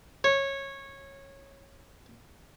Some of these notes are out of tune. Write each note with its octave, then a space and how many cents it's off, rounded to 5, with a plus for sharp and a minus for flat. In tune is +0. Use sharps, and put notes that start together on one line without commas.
C#5 -15